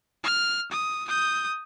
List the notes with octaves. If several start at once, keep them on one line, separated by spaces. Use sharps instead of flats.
F6
D#6
D#6 G6